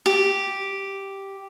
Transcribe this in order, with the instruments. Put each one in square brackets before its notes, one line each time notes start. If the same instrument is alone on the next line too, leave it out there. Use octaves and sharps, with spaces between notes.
[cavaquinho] G4